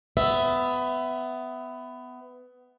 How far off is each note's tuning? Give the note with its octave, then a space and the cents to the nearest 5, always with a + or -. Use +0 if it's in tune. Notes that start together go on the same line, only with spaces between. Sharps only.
B3 +20 E5 +0